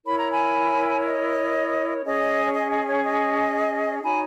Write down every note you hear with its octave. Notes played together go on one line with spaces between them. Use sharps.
E4 A#4 C#5 B5
A#5
G#5 B5
D#5
C#4 G#4 C#5 D#5
C#5
D#5
D#5
C#5
D#5
D#4 F#4 C#5 G#5 B5